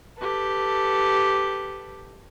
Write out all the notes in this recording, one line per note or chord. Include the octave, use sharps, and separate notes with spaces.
G4 A4 B4